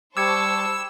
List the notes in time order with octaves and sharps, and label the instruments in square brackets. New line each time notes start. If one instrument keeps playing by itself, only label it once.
[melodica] G3 [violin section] C5 A5 C#6 [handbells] D6 G#6 C#7 [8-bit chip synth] E6